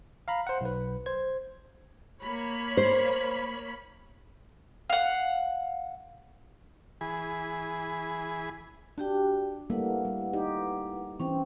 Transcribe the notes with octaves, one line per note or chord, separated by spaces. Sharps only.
F5 A#5 B5
C5 F#5
B1 B4
C5 G#6
A#3 C#5 B5
C5
F5 F#5
E3 G#4 G#5 B5
D4 F#4 G4 G5
G3 A3 A#3 E4 B4 F#5
G3
D#4 G4
E3 C4 C#4 G5